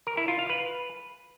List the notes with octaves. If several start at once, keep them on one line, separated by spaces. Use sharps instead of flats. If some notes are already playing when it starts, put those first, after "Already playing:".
A#4
E4
F4
F5
B4